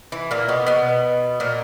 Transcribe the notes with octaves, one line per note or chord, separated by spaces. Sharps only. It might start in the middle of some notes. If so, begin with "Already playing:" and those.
E3
A#2 A#3
B2 B3
B2 B3
A#2 A#3